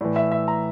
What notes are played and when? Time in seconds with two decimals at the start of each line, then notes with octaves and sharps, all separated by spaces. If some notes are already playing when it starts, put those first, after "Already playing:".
0.01 A2 E3 D5
0.16 E5
0.32 E5
0.48 A#5